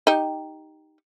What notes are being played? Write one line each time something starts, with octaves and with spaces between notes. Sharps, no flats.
D#4 G4